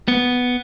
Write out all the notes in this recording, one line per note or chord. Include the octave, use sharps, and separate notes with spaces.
B3